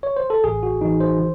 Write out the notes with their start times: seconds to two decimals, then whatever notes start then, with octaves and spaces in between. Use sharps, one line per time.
0.03 C#5
0.16 C5
0.30 A4
0.44 A1 G#4
0.63 F#4
0.81 E3 D#4
1.00 C5
1.19 D#3